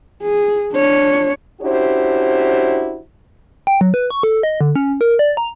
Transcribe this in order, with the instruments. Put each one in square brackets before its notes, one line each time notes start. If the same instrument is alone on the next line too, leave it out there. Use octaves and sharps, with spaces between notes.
[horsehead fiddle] G#4
D4 C#5
[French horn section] C#4 D4 E4 F#4 G4 C5
[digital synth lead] G5
F#3
B4
C#6
A4
D#5
D3
C#4
A#4
D5
A#5